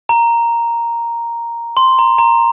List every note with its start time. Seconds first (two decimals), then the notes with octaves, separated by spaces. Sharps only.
0.09 A#5
1.77 C6
1.99 A#5
2.18 A#5